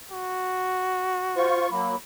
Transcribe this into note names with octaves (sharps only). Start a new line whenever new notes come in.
F#4
F4 C5 C#6
F#3 A#3 B5